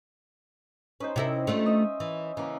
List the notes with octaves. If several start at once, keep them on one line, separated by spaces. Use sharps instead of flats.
C#4 D#4 B4 C5
C3 E4 A#4
A3 D4 F4
D#5 E5
E3
C#3 E3 A#3